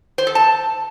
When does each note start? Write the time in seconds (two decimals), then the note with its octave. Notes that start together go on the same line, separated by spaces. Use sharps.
0.18 C5
0.27 A4
0.35 A5